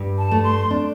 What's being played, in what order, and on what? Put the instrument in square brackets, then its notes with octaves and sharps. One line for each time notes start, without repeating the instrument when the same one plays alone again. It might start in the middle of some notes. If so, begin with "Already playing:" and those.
Already playing: [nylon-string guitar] G2
[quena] A5
[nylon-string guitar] A3
[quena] C6
[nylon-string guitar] D4